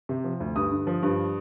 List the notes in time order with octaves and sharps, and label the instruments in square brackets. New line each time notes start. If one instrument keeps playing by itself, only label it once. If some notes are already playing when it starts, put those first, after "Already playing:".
[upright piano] C3
F3
D2
G2 D#6
D3
F3
G2